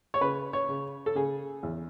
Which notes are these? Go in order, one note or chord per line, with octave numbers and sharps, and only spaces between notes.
C#5
C#3 B4
C#5
C#3
A4
C#3 G#4
E2